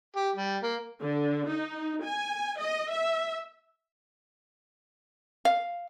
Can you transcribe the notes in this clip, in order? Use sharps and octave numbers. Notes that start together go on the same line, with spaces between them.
G4
G3
A#3
D3
D#4
G#5
D#5
E5
F5